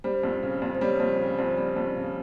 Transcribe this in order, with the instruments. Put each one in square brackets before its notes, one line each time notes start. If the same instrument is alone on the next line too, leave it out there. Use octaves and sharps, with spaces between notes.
[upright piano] G3 [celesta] C5
[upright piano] F2
C#3
F2
[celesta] C5
[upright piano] G3 [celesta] C#5
[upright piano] F2 [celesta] C5
[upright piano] C#3
[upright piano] F2 [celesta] C5
[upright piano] G3
F2
C#3